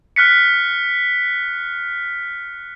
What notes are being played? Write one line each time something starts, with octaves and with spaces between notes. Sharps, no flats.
F6 F#6 B6 C#7